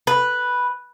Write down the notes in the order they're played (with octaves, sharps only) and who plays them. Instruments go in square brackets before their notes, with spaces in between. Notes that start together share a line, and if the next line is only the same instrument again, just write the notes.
[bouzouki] B4